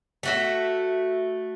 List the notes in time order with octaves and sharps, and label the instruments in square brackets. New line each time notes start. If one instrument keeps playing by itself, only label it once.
[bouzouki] A3 F#4 E5